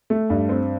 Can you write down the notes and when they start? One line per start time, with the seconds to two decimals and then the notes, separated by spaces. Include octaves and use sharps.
0.10 A3
0.30 G2
0.49 C4